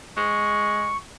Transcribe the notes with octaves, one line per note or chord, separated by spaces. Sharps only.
G#3 C#6